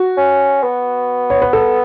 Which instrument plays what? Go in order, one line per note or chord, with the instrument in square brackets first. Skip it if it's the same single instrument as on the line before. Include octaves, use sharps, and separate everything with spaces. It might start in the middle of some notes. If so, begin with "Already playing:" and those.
Already playing: [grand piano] F#4
[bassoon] C#4
B3
[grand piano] C#5
B4
A4